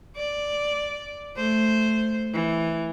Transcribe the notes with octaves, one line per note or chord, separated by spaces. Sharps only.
D5
A3 C5
E3